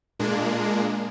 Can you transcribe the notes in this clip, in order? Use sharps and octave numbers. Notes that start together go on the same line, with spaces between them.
A#2 G#3 A#3 D4